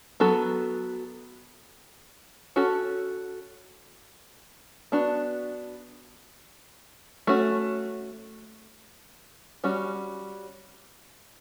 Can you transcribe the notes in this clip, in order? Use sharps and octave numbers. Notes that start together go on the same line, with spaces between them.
F#3 B3 F#4 A4
C#4 F#4 A4
B3 D4 F#4
A3 C#4 F#4
G3 C#4 F#4